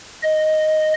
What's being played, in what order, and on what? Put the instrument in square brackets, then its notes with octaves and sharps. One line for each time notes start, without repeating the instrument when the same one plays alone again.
[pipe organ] D#5